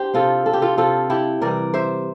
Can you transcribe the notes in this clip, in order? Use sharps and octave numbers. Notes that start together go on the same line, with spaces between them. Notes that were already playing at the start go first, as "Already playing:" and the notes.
Already playing: D4 G4 C5
C3 F3 C4 F4 A4
A4
G4
F4 A4
C3 F3 C4 F4 A4
E4 G4
C3 E3 G3 A#4 D5
C5 E5